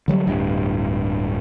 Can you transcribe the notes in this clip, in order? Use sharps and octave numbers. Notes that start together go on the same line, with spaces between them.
D3 F#3 G3
D1 G2